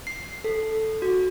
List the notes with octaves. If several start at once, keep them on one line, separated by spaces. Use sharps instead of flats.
C7
A4
F#4